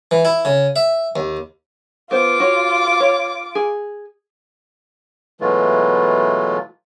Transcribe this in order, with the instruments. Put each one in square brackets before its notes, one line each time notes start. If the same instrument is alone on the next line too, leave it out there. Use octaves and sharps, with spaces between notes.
[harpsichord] E3
E4
C#3
E5
D#2
[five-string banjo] B3 C5 [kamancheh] F4 D6
[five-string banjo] F#4 C#5
C#5
G#4
[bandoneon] B2 E3 F#3 G#3 A3 F4